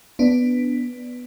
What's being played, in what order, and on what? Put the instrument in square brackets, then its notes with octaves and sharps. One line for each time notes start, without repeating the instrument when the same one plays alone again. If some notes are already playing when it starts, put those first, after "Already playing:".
[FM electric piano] B3 D4